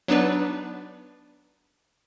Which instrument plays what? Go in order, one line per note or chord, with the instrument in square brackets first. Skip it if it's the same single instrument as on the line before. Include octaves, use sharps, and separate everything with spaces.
[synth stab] F#3 B3 D4 D#4 B4 D5